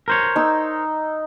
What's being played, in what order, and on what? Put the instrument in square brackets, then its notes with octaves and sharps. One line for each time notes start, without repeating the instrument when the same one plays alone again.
[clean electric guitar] A#4 C5 C#5
[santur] D#4 E6